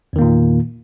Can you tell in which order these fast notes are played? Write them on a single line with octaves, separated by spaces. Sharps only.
E2 D#3 A#3 A#2